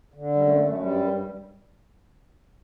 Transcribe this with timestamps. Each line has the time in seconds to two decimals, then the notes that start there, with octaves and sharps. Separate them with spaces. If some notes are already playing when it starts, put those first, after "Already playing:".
0.14 D3
0.35 F#2 G3
0.46 A3
0.57 F#2 A3
0.68 A3
0.79 G2 G3
1.01 G2
1.22 G3